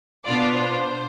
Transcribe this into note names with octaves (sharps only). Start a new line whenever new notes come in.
B2 B3 D4 F4 D5
C5